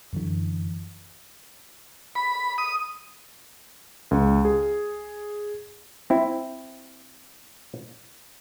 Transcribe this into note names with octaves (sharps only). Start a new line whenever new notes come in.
F#2 D3 E3
B5
D#6
C#2
G#4
C4 E4